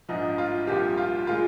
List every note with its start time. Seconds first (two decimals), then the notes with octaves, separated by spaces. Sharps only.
0.09 A#1 G#2 F3 D#4
0.38 F4
0.67 C2 A#2 F3 G4
0.97 F4
1.27 A#2 G#3 F4